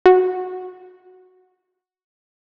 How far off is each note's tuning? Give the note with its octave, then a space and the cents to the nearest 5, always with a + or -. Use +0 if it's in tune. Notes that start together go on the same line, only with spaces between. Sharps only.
F#4 -5